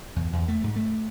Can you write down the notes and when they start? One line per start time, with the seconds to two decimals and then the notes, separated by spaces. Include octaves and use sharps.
0.16 E2
0.33 E2
0.48 A3
0.64 G#2
0.76 A3